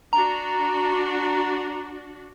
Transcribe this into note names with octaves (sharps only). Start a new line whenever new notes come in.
D4 F#4 A#5